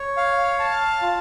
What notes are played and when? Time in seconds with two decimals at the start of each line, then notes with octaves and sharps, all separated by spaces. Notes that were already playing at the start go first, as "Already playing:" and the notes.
Already playing: C#5
0.17 F5
0.59 A5
1.02 F4